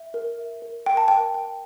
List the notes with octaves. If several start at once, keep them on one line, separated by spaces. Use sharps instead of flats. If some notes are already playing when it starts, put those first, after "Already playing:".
Already playing: E5
A#4
E5
A#4
A#4 G5
A5
A#4 G5
G5